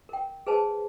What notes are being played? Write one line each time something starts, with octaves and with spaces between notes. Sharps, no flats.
A#4 G5
G#4 B4 C5 G#5 A5